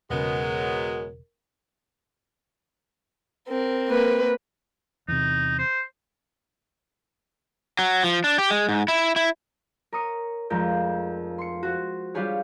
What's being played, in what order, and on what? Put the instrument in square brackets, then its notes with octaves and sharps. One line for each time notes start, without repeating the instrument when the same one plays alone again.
[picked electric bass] E1 C#3 [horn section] F#3 G#3 B3 [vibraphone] A#4
[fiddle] C4 A#4
[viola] A#3 B4
[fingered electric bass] E2 C3 [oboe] D#4
[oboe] C5
[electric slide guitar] F#3
F3
D4
G4
G#3
G#2
E4
E4
[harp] A#4 C#5 D#6 C#7
F1 F2 G#3 A#4 G6
C6 C#7
F#4 C5
G3 D4 F4 G4 G#4 C#5